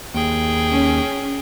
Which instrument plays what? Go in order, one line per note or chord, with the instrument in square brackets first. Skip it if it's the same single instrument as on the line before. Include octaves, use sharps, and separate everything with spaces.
[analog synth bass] D#2 [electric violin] G#4 G5
[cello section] C#4